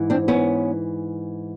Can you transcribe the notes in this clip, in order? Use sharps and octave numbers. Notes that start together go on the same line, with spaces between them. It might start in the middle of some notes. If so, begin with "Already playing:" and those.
Already playing: G#2 E3
C4 D4
B3 C#4